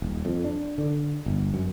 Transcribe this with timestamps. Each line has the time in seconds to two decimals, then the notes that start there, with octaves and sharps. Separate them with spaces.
0.02 D#1
0.25 F2
0.44 D4
0.78 D3
1.26 G1
1.54 F#2